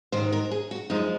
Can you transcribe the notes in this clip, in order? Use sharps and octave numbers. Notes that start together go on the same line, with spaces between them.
G#2 D#3 F#3 C5
A#4
G#4
F#4
F#2 F3 G#3 D#4